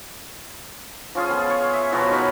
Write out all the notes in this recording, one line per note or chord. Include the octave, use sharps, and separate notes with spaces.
F3 C#4 F4 G#4
B3 G#4
C#5
E5
B2 F3 F#3 B3
D#4 A#4 C#5 B5